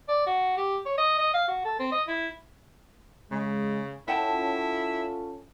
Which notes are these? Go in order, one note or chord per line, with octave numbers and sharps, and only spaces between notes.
D5
F#4
G4
C#5
D#5
D#5
F5
F#4
A4
C4
D#5
E4
C#3 G#3
C#4 E4 F4 A4 F#5 G5 A5